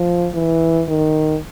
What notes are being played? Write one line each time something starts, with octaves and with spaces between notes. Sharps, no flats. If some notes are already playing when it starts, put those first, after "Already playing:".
Already playing: F3
E3
D#3